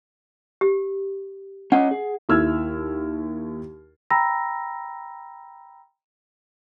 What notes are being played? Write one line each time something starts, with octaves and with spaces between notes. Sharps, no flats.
G4
C#4 C#5 D#5 F#5
G#4
D#2 E4 E6 F6 G#6
G5 A#5 B5 E6 A#6